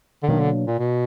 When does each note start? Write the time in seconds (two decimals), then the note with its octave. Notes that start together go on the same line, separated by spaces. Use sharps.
0.23 D3
0.28 B2 D#3 F#3 A#3 D4
0.40 D3
0.67 A#2
0.79 B2